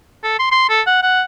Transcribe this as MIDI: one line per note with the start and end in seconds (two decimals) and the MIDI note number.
0.23 0.35 69
0.39 0.51 84
0.51 0.65 84
0.69 0.81 69
0.86 1.00 78
1.03 1.22 78